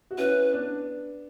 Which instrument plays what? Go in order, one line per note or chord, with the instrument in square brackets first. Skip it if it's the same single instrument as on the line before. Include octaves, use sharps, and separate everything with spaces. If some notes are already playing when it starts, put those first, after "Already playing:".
[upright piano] F#4
[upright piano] C#4 E4 [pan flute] B4
[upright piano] B3 D4